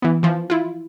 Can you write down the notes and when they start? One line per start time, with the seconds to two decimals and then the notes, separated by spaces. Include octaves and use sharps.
0.02 E3 B3
0.23 E3 F3
0.50 E4 F4